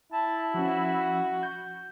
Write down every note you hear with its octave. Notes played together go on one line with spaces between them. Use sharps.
E4 A5
F3 C#4 F#4
G6